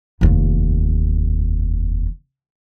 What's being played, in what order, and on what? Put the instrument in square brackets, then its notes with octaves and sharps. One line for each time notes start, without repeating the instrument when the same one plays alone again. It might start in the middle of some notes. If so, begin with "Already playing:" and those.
[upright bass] F1 D#2